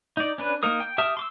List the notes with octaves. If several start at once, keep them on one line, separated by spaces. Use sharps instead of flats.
D#4 D5
C#4 D4 B4
A#3 D#4 A#4 D#6
G5
G4 E5 A5 D#6 F6
C6 D6 E6